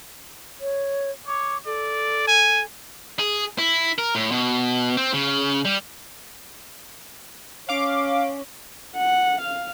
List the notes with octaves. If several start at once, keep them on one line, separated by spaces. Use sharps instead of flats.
C#5
C#5 D6
A4 D5
G#5
G#4
E4
A#4
A2
B2
C4
C#3
G3
C#4 F5 D6
F#5
F5